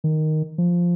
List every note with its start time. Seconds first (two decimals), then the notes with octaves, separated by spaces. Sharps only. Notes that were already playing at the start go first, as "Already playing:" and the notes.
0.04 D#3
0.58 F3